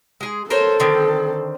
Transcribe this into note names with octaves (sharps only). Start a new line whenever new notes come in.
G#3 G#4
A4 A#4 C5 C#5
D3 D#3 C4